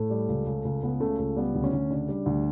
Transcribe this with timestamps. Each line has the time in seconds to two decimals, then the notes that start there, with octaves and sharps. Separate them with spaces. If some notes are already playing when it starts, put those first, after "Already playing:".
Already playing: A2 A3
0.10 G3
0.28 C#2
0.47 C#2
0.65 C#2
0.83 C#2 B3
1.00 C#3 A3
1.19 C#2 A3
1.37 G3 B3
1.54 D2
1.64 C#4
1.73 D2
1.90 C#3 D4
2.08 G3
2.26 D2